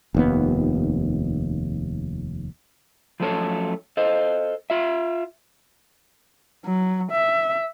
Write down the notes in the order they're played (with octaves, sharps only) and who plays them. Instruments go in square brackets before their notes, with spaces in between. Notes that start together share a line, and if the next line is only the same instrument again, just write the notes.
[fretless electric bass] F1 D#2 B3
[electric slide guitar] F3 F#3 A3 C#4 A4 C#5
A4 C5 D#5
F4 E5
[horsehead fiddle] F#3
E5